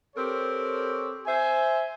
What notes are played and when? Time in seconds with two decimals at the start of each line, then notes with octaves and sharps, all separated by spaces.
0.16 C4 G4 A4 A#4 C5 C#5
1.27 C5 E5 G#5